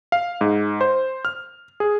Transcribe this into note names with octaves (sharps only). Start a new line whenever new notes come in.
F5
G#2
C5
F6
G#4